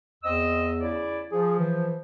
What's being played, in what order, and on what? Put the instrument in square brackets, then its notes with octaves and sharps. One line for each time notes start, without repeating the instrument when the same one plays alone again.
[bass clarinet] E2 [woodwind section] C4 D#5 E6
[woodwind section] C#3 E4 D5
[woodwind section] F3 [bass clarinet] G#4
[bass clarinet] E3